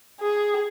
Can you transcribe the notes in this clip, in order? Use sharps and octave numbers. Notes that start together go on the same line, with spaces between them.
G#4